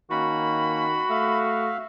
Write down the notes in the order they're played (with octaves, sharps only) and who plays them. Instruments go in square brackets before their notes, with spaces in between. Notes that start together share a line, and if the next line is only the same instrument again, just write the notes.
[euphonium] D#3 [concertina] A#3 C#4 [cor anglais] F#4 [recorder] B5
[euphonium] A3 [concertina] E5 F5